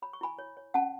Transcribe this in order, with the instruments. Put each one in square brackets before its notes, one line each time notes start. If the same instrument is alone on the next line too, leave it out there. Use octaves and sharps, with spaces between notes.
[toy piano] C#5 B5
C#6
E4 G#5 B5
C#5
C#5
C#4 F#5 A5